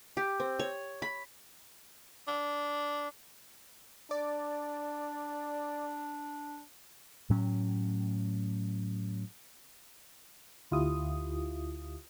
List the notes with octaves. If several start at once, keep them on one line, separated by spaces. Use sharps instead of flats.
G4
C4
C#5
B5
D4
D4 D5
A2 F#3 C#4
D2 E4 F4 G4 D#6